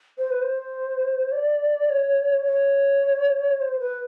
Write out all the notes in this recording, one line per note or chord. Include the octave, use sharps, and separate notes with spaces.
C5
B4
C5
D5
C#5
C#5
C5
B4